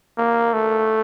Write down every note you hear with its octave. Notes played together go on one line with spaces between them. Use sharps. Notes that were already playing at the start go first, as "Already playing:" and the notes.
A#3
A3